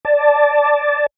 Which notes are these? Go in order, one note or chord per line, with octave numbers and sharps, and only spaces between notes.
D5 A5